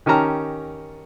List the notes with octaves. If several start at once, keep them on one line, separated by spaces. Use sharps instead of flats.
D#3 C#4 G4 A5 A#5 F6